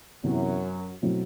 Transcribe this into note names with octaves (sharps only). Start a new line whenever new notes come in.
F#2 C3 E3 F#3 B3 E4
B2 F#3 A3 C4 E4